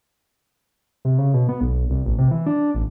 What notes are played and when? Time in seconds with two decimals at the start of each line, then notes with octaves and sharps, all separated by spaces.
1.05 C3
1.18 C#3
1.34 B2
1.49 B3
1.61 B1
1.90 C2
2.06 A1
2.18 C3
2.31 E3
2.46 D4
2.75 A1